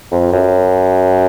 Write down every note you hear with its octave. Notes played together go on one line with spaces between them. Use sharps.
F2
F#2